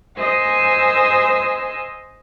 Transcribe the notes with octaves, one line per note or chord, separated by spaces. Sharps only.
C5 D#5 G#5 E6